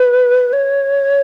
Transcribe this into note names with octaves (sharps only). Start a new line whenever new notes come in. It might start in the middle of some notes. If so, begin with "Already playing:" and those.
Already playing: B4
C#5